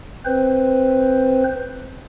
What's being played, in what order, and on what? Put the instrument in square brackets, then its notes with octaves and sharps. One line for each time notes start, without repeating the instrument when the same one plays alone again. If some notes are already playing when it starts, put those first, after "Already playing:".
[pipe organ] C4 B4 C5